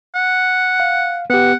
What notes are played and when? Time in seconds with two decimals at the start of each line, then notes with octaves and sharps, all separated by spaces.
0.15 F#5
0.80 F5
1.30 B3 G4 F#5